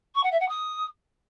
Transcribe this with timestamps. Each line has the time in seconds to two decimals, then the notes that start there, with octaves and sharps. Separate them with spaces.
0.15 C#6
0.23 F#5
0.32 E5
0.40 F#5
0.48 D#6